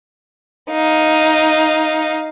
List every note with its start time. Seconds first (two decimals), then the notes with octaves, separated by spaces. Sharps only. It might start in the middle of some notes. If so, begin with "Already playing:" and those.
0.70 D#4 F5